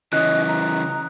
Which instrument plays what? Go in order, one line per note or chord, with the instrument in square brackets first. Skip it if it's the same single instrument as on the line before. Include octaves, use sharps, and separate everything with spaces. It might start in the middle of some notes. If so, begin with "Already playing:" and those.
[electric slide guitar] C#3 E3 [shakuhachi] D#5 [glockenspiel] D#6 F#6
[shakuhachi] A#5